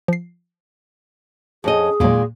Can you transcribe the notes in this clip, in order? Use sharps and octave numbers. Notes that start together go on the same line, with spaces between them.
F3 C7
F2 C#4 G#4 D#5
E2 A#2 D#3 F#3 G#3